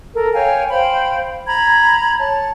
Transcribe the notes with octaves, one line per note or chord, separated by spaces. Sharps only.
A4 A#4
C#5 F5 G5 G#5
C5 F5 G5 B5
A#5 B5 G#6
C#5 A5